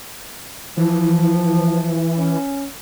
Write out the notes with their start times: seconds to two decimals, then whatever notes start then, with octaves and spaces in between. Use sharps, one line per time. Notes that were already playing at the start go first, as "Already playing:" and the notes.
0.77 E3 F3
2.17 C#4